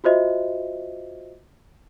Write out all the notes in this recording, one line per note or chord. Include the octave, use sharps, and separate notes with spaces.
F4 F#4 C5 D#5 E5